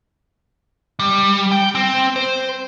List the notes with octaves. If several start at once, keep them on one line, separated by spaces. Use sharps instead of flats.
G3
G5
C4
C5